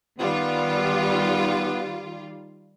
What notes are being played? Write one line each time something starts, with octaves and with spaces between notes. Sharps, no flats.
D#3 G3 B3 F4